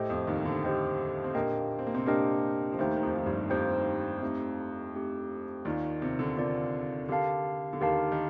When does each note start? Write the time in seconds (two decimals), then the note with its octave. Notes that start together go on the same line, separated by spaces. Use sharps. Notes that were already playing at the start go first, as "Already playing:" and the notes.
Already playing: A2 A3 G4 C5 D#5 G5
0.10 F2 F3
0.27 D#2 D#3
0.45 D3
0.64 G4 C5 D#5 G5
1.24 C4
1.35 A#2 A#3 D4 G4 A#4 D#5 G5
1.79 C4
1.87 A#3
1.94 C3 C4
2.06 A#2 A#3 D4 G4 A#4 D#5 G5
2.72 F3
2.78 D#2 D#3 A3 D#4 G4 C5 G5
2.96 D#3
3.02 F2 F3
3.16 F3
3.26 G2 G3
3.50 F2 F3 A3 D#4 G4 C5 G5
4.22 A3 C4 D#4 G4
4.94 A3 C4 D#4 G4
5.65 D#2 D#3 F4 A#4 D5
6.02 C3
6.19 D3
6.37 C3 F4 A#4 D5
7.09 D3 G4 A#4 F5 A5
7.73 D3
7.81 D#2 D#3 G4 A#4 F5 A5
8.12 D#3